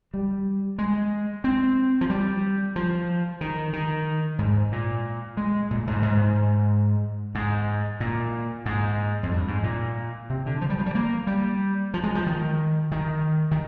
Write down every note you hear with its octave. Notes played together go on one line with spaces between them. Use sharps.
G3
G#3
C4
F3
G3
F3
D#3
D#3
G#2
A#2
G#3
A#2
G#2
G#2
G#2
A#2
G#2
F2
G2
G#2
A#2
C3
D3
F3
G3
F3
G3
A#3
G3
F3
G#3
F3
D#3
D#3
D#3